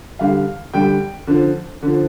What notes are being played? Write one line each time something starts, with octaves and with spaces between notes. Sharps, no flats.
D3 G3 F5
D3 G3 G5
D3 F3
D3 F3